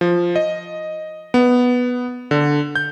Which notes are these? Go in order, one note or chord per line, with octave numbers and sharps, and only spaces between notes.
F3
D#5
B3
D3
G6